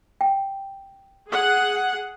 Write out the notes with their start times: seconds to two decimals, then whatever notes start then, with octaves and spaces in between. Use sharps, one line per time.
0.21 G5
1.30 G#4 F#5